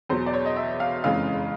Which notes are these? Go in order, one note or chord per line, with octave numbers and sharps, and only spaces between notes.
E2 B2 F#3 C5
D5
C#5
D#5
E5
F5
F#1 F2 C#3 E3 G#3 F5